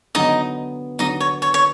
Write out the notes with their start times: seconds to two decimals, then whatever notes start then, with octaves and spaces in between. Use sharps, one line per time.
0.15 D3 F#3 B3 D#4 D#5
0.99 D3 F#3 B3 D#4 D#5
1.20 C#5
1.42 C#5
1.54 C#5